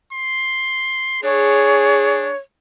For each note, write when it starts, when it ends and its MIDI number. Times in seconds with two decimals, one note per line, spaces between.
0.12 1.20 84
1.23 2.33 62
1.23 2.29 68
1.23 2.37 73